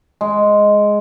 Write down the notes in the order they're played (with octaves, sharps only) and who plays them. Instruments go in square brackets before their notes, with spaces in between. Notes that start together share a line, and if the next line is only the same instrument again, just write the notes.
[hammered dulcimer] G#3